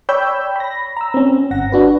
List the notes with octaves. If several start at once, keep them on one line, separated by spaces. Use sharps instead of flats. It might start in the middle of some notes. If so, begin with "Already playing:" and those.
C#5 D5 G5 B5 E6 G6
B5 A#6
A#5 E6
C4 C#4
G1 F#5 A#6
D4 F#4 B4